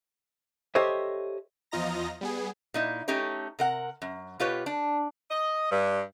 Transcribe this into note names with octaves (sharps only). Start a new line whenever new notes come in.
G4 A4 C5 C#5 D#5 E5
E2 F3 F4 D#5 A#5 A#6
G3 B3 G#4
A#2 D#4 E4
A3 C#4 D#4 G4 C#5
C3 A#4 F#5
F#2
B2 F4 G4 B4 C#5
D4
D#5
G2